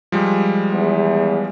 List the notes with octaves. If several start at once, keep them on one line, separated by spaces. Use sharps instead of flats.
F3 G3 G#3
E2